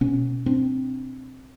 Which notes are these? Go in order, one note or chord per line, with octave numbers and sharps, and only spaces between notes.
B2 B3 C#4
C4 D4